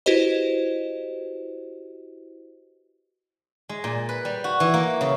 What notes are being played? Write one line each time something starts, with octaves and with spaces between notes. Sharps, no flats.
E4 F#4 G4 B4 C5 D#5
G#3
A#2
B4
G3
F#4
E3
A#3
C#3